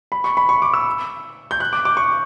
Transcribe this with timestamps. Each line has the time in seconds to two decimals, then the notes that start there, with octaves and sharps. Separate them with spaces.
0.12 B5
0.24 C#6
0.37 B5
0.49 C#6
0.62 D6
0.74 E6
1.51 G6
1.60 F#6
1.73 D6
1.85 D6
1.97 C#6